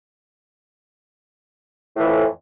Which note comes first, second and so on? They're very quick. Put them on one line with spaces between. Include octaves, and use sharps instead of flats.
A2 E3 F2